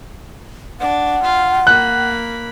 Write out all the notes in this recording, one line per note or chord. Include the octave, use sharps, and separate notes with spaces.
D4 F#5
F4 F5
A#3 B5 F#6